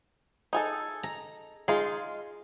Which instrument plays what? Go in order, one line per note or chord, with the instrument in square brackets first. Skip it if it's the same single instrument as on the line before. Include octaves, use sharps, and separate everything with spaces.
[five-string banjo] D#4 G#4 A4
[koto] A#5
[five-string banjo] G#3 D#4 F4 [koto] G#4